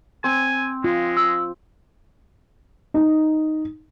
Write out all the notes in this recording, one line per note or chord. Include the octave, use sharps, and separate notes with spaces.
C4 G#5
G#3 F4
E6
D#4